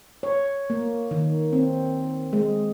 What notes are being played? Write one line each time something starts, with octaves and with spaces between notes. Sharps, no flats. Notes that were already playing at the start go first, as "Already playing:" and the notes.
C#5
A#3
D#3
C4
G#3